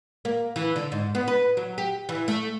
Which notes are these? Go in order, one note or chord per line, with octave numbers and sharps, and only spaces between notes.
A#3
E3
D3
G#2
B3
B4
F#3
G4
E3
A3